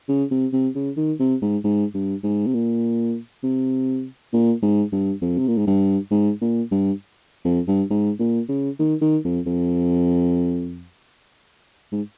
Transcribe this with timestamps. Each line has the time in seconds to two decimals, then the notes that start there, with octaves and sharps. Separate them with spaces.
0.08 C#3
0.31 C3
0.53 C3
0.75 C#3
0.97 D#3
1.20 C3
1.42 G#2
1.64 G#2
1.94 G2
2.23 G#2
2.46 C3
2.54 A#2
3.43 C3
4.33 A#2
4.62 G#2
4.92 G2
5.21 F2
5.38 C3
5.48 A#2
5.57 G#2
5.67 G2
6.11 G#2
6.41 A#2
6.71 G2
7.45 F2
7.67 G2
7.90 G#2
8.19 A#2
8.49 C#3
8.79 D#3
9.01 D#3
9.24 F2
9.46 F2
11.92 G#2